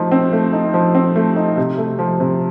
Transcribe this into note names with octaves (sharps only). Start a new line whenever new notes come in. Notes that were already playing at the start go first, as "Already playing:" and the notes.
Already playing: F3 A3 D#4
C4
A3
D#4
F3
C4
A3
D#4
C3
A3
F3
C3